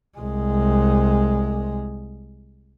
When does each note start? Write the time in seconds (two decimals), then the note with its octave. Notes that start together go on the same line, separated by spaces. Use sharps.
0.18 C2 G#3